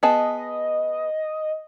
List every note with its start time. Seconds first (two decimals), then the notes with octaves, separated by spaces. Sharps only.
0.03 B3 G#4 D#5 A5